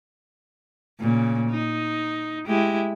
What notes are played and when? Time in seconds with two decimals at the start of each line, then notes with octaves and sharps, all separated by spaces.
1.01 A#2 C#3
1.50 D#4
2.47 G#3 E4 G4